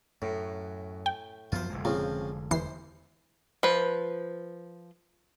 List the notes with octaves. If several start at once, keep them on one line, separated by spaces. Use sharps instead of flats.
F#2 A2
G5
F#2 F3 B3 F4 C5
F1 D3 G#3
A#2 C#3 F3 C4
E2 E3 C5 C7
F3 B4